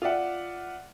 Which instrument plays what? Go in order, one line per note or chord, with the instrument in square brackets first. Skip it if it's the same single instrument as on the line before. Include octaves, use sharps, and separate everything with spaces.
[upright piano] F4 D5 E5 F#5